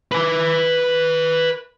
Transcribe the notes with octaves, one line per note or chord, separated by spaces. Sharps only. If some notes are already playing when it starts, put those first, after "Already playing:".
B4 G#5